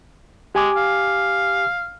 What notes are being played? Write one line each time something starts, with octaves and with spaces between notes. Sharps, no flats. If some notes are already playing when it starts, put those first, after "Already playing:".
G#3 G4 G#5 D6
F5